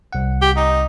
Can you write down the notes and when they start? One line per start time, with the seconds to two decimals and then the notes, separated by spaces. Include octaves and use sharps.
0.13 C2 F#5
0.42 G4
0.56 D#4